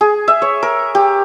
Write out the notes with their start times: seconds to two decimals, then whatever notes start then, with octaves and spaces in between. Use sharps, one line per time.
0.01 G#4
0.28 E5
0.42 C#5
0.63 A#4
0.95 G4